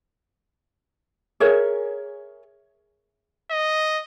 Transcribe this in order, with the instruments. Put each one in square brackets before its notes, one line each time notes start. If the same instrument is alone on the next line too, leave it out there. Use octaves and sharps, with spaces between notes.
[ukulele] G#4 A#4 C#5 E5
[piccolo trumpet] D#5